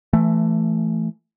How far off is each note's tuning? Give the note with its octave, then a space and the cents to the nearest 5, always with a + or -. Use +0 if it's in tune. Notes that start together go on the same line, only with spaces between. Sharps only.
E3 +25 A3 +0